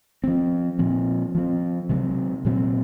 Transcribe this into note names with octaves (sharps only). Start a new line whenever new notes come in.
F3 C4
A#2 F3 C4
F3 C4
C3 F#3 C4
A#2 F#3 C4